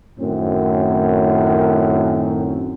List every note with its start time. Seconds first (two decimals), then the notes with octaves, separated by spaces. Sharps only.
0.18 F#2 A2 D#3 C4